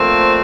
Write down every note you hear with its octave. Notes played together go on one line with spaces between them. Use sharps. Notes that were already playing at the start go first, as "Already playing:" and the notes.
Already playing: A#2 F3 A3 C4